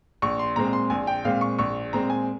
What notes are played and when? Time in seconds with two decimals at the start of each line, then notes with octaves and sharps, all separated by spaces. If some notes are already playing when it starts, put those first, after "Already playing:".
0.22 A#1 C#6
0.39 C6
0.56 A#2 G#3 C4 A#5
0.73 C6
0.90 A#1 G#5
1.07 G5
1.25 A#2 G#3 C4 F5
1.41 C#6
1.59 A#1 C#6
1.93 A#2 G#3 C4 A#5
2.10 G#5